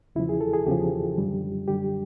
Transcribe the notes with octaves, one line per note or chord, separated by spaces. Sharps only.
E2 C#3 F3 E4
G#4
A4
G#4
E2 C#3 F3 G4
F#2 D3 G3
F#2 D3 G3 G4